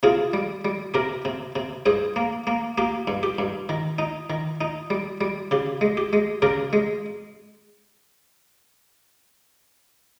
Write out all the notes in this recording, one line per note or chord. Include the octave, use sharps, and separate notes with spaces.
C3 F4 G#4
G3
G3
C3 G4 A#4
C3
C3
G2 G#4 C5
A#3
A#3
A#3 G4
G2
G4
G2
D#3
D#4
D#3
D#4
G3
G3
C#3 G4
G#3
G4
G#3
C#3 G4 A#4
G#3